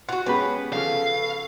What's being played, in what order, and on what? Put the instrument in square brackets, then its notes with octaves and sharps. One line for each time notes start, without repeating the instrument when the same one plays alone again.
[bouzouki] F4 F#4 [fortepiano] F#5
[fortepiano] G#3 G4 B4 [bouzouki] B3 [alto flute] C#4
[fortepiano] C#3 F3 [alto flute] A4 [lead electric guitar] F5